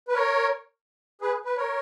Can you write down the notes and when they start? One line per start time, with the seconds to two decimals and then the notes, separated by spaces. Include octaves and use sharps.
0.08 B4
0.14 A#4 C#5
1.21 G#4 B4
1.45 B4
1.57 A#4 C#5